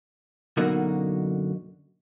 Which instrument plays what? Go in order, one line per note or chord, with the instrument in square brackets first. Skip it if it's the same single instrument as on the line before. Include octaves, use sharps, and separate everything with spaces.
[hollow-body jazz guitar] F#2 B2 D3 A#3 D#4 F#4